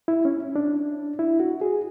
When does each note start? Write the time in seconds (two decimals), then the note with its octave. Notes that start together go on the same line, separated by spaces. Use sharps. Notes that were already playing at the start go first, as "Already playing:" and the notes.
0.08 E4
0.25 C#4
0.56 D4
1.19 E4
1.40 F#4
1.61 G#4